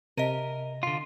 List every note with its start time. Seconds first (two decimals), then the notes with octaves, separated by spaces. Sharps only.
0.17 C3 A#4 D#5 D#7
0.83 D3 F4